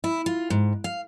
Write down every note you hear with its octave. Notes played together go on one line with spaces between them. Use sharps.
E4
F4
G#2
F5